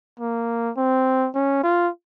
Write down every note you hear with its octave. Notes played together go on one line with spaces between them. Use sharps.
A#3
C4
C#4
F4